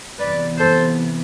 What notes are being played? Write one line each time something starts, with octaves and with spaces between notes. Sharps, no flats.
C3 E3 B3 B4 D5
A4 C5